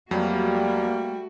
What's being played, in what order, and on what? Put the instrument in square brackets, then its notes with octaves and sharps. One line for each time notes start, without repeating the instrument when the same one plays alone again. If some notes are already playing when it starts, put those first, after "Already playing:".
[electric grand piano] F2 F#3 [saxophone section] G3 [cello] A3 F#4 [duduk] A#3